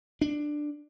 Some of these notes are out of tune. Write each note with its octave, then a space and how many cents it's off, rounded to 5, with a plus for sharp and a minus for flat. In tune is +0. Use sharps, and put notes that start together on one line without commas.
D4 +10